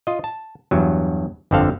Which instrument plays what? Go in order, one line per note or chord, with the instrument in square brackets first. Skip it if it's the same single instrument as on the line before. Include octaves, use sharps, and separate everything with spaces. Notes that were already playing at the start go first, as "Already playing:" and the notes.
[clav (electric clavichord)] F4 D#5
A5
E2 G2 F#3
G1 F2 D3 C4 A4 F5